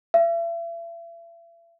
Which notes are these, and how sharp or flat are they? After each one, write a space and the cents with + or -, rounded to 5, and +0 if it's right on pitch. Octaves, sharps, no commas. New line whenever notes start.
E5 +40